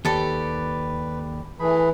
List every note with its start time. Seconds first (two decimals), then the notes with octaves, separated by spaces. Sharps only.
0.05 D#2 G4 A4 B4 D5
1.60 E3 A3 G#4 B5